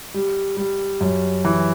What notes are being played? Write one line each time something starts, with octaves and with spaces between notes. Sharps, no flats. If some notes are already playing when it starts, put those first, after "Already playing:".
G3
G3
F#2
E3